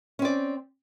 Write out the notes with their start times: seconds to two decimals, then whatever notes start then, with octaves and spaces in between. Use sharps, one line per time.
0.19 C#4
0.22 C4
0.25 D5